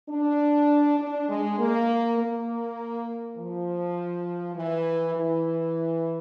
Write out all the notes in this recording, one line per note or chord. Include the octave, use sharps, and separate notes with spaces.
D4
D4
G#3
A#3
A#3
F3
E3
E3